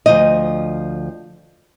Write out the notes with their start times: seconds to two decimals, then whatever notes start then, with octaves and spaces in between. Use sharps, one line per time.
0.06 D2 F3 D#5